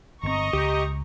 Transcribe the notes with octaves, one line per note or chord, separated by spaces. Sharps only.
G1 A#2 C4 D#5 A#5 C#6
C#2 G4